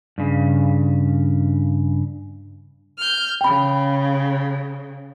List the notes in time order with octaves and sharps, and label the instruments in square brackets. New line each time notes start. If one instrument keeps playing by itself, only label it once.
[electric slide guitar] G2 C#3
[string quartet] F6 G6
[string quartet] C#3 [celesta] G5 B5